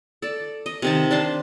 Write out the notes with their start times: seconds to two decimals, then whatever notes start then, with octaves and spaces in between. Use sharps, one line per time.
0.22 A4 D5
0.66 D#5
0.82 C3 D#3 A5
1.11 D4 C5 A5 C6